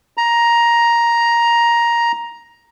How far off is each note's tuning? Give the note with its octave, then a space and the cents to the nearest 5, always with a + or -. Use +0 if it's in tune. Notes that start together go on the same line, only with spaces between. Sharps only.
A#5 +10